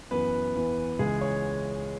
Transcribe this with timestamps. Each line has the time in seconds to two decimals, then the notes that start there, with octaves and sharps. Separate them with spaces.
0.11 F#2 E3 B3 B4
0.56 E2 E3
0.99 C#2 C#3 E3 G#3 G#4
1.21 C#5